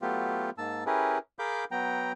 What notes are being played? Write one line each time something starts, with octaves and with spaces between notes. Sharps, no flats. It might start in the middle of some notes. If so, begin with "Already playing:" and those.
F#3 A3 B3 F4 G4
G#2 A#3 A5 E6
C#4 E4 G4 G#4 A#4 B4
G#4 A#4 F5 B5 D6 G6
F#3 B3 G5 A#5